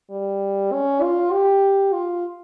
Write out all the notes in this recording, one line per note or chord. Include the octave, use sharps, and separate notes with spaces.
G3
C#4
F4
G4
F4